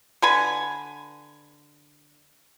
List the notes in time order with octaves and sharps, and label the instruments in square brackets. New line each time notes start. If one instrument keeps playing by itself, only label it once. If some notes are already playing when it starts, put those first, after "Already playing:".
[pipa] D3 B4 G#5